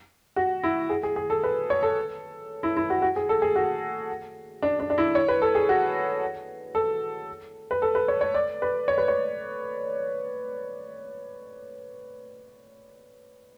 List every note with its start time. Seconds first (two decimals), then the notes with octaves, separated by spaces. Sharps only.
0.36 F#4
0.63 E4
0.90 G#4
1.03 G#4
1.16 G#4
1.30 A4
1.44 B4
1.70 C#5
1.83 A4
2.63 E4
2.77 E4
2.90 F#4
3.02 F#4
3.16 G#4
3.29 A4
3.42 G#4
3.56 F#4
4.62 D4
4.80 D4
4.90 D4
4.98 E4
5.15 C#5
5.28 B4
5.42 A4
5.55 G#4
5.69 F#4
6.75 A4
7.71 B4
7.82 A4
7.95 B4
8.08 C#5
8.21 C#5
8.34 D5
8.62 B4
8.88 C#5
8.98 B4
9.08 C#5